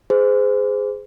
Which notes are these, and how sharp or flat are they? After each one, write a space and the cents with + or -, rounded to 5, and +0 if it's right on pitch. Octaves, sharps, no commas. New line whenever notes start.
G#4 +0 C5 -30